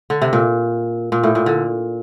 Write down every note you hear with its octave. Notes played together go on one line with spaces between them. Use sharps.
D3
C3
A#2
A#2
A2
A#2
D3